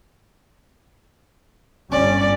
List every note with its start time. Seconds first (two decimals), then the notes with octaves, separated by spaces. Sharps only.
1.92 G1 G2 C#4 D5